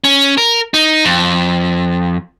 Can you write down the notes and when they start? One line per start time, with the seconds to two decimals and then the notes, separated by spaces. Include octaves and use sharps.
0.04 C#4
0.38 A#4
0.74 D#4
1.05 F2